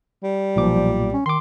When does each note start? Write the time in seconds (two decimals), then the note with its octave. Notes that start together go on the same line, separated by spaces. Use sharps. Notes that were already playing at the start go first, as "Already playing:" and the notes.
0.23 G3
0.56 B1 A#2 F3 D6
1.13 C#4
1.26 D#3 C6 D6